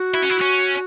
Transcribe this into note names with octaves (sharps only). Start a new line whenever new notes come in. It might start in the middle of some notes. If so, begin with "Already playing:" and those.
Already playing: F#4
E4
C#4
E4
C#4